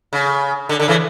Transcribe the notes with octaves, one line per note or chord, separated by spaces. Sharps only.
C#3
D3
D3
C#3 E3